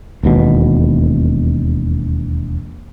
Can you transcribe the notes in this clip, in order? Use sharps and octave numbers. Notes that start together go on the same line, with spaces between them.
E1 D#2 B2